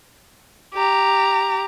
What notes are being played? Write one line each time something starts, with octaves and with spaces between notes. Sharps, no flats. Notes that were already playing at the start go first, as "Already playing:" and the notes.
G4 A#5